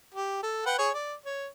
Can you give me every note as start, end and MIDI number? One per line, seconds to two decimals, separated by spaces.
0.14 0.42 67
0.43 0.65 69
0.66 0.78 71
0.66 0.78 78
0.66 0.78 79
0.79 0.89 68
0.79 0.89 73
0.79 0.89 85
0.94 1.14 74
1.26 1.47 73